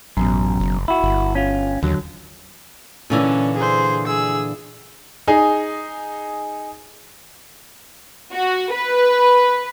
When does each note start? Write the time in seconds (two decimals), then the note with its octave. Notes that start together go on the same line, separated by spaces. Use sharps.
0.17 A1 F#2 B2
0.60 F#1
0.88 E4 F#4
1.03 G1
1.35 C#4 F4
1.83 D#2 D3 F#3
3.10 A#2 D3 E3 C#4
3.57 G#4 C5
4.07 G#4 E6
5.28 D#4 G#4 G#5
8.31 F#4
8.72 B4